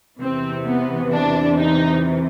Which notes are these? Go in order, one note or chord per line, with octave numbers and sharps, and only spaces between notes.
E2 C3 E3 C4
B3
D4
D#4